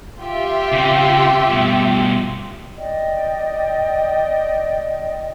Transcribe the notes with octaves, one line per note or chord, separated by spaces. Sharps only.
F4 G4 E5
C#3 C4
G2 B2
D5 D#5 G5